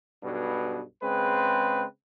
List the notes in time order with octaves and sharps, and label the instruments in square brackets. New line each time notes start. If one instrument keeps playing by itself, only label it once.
[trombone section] B1 G2 B2
C#3 G#3 C4 B4